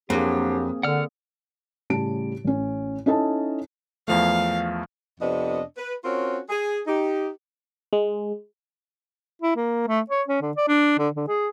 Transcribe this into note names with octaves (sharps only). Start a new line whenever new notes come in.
F2 F#3 A#3 C4 D4 G4 G#4
D3 F#5 F6
A2 C#3 G3 A5 D7
A1 C#4
C#4 D#4 E4 A4 D#5 A5
E2 F3 A3 F5
F2 C3 B3 D4 D#5
B4
C4 C#4 F4 F#4 A#4 C#5
G#4
D#4 G4
G#3
E4
A#3
A3
C#5
C#4
D3
D5
D4
D3
D3
G#4